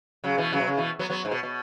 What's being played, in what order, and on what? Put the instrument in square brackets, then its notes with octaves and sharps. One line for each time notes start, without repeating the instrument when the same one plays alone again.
[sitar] C#3 F#3
B2 E3
C#3 F#3
B2
C#3
B2 E3
F#3 B3
F#3 B3
G#2
B2
B2